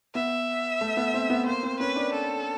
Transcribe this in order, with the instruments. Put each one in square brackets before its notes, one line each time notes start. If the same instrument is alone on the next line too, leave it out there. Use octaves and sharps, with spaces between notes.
[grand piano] B3 [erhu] E5
[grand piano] A3
B3
C4
B3
[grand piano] A#3 [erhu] C5
[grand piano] C4
[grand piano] C#4 [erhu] B4
[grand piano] D4
[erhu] A4